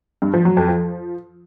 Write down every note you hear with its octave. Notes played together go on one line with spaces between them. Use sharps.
G2
F3
F#3
F2
F3